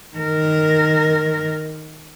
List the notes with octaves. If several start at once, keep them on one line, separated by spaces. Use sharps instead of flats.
D#3 A#4